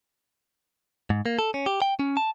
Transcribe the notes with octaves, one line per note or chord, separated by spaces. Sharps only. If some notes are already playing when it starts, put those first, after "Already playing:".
G#2
A#3
A4
C#4
G4
G5
C#4
A5